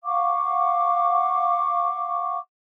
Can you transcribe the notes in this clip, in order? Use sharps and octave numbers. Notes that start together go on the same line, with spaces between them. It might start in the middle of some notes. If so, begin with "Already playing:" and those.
F5 F#5 C#6 D6